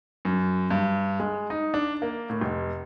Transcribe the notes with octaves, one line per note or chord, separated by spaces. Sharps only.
F#2
G2
G#3
D#4
D4
A#3
A2
F1